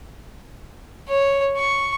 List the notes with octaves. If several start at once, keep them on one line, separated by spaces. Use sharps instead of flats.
C#5
C#6